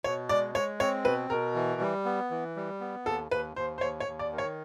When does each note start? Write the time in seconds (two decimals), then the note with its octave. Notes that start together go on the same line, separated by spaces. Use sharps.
0.04 B2 C#5
0.29 G#3 D5
0.55 G#3 C#5
0.80 C4 C#5
1.05 B2 B4
1.30 B2 A#4
1.55 E3
1.81 G3
2.05 B3
2.31 E3
2.56 G3
2.81 B3
3.06 D#2 A4
3.31 D#2 B4
3.56 D#2 C5
3.78 C5
3.81 D#2 C#5
4.00 C#5
4.07 D#2
4.19 D5
4.32 D#3
4.38 C#5